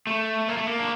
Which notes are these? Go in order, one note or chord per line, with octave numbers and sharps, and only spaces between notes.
A3
A#3
A3
A#3
D4